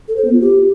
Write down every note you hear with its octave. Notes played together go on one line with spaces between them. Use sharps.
A4
C5
B3
F4
G4